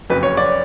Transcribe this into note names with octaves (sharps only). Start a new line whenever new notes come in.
F#1 F2 C#3 F#3 B4
C#5
D5